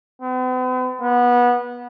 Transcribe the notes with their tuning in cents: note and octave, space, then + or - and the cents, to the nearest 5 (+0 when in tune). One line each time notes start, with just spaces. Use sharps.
B3 +45
B3 -20